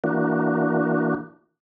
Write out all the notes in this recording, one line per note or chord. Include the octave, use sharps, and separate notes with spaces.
E3 A#3 D4 F#4